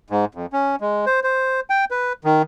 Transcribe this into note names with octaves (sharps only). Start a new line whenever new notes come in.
G#2
F2
C#4
G#3
C5
C5
G5
B4
D#3